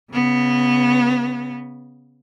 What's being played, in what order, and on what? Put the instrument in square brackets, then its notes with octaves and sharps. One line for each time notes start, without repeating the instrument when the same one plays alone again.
[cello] C#3 B3